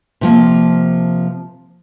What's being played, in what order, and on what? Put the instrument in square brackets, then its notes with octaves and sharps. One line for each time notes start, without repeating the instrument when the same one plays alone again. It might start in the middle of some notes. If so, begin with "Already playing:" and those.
[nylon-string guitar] C3 F3 A#3